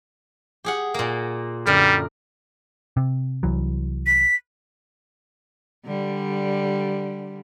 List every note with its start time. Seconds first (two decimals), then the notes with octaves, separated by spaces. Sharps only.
0.64 G4 G#4 F#5
0.94 A#2 A#3
1.66 F#2 D3 G3 A#4
2.97 C3
3.43 C2 E3 F#3
4.06 B6
5.85 D3 G3